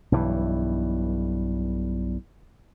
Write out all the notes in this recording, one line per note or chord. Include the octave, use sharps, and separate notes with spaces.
B1 G2 E3